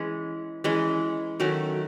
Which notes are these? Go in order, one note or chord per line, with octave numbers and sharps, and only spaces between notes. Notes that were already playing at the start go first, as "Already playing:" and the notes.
Already playing: E3 G#3 C#4
E3 G#3 C#4
D#3 F#3 A3 C#4